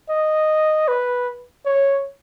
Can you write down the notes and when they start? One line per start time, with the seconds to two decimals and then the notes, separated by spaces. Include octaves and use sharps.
0.09 D#5
0.88 B4
1.65 C#5